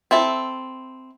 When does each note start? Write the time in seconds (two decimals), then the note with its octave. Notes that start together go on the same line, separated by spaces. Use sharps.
0.11 C4 E4 A4